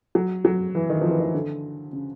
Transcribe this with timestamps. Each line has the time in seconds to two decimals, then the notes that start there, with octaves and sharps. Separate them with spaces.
0.15 F#3
0.45 F#3
0.75 E3
0.90 D#3
1.01 F3
1.09 E3
1.19 D#3
1.34 D3
1.93 C#3